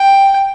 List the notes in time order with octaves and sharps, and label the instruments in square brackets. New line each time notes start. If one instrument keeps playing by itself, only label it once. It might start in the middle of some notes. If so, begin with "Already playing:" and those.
Already playing: [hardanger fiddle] G5